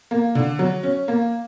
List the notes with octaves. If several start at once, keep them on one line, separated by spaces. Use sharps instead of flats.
A#3
D3
F#3
C#4
A#3